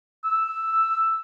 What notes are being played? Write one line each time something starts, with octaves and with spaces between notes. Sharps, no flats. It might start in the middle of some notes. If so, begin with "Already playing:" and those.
E6